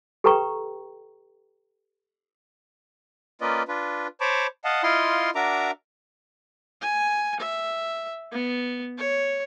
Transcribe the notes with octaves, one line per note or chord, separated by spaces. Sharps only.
G4 A4 B4 G5 A#5 C#6
A#3 C#4 F4 B4 D5 D#5
D4 F4 B4
C5 C#5 A5 B5 C#6 D6
D#5 F5 F#5 A5
E4 F4 D#5 F5 C6
D4 F#4 A#4 E5 A#5 D6
G#5
E5
B3
C#5